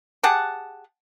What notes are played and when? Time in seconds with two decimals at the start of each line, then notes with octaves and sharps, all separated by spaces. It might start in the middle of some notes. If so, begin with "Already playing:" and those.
0.23 G4 G#4 F#5 A5